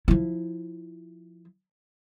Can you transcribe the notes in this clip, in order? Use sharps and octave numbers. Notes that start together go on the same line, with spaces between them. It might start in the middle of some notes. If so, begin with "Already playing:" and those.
F3 E4